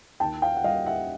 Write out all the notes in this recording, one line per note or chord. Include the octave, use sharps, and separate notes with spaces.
D#2 G5 A5
F5 G5
F#5
G3 D#5 F5
E5 F#5